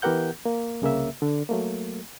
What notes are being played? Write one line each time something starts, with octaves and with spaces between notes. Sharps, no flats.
E3 B3 G4 A#4 F#5 G6
A#3
C2 C#3 A#3 E5
D3
F#3 A3 A#3